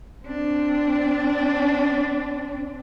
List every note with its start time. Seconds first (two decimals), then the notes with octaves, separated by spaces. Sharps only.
0.26 C4 D4